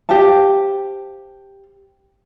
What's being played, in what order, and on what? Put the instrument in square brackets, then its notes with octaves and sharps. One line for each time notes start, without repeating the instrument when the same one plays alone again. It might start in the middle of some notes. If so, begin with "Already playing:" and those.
[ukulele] G4 C5 F5 A5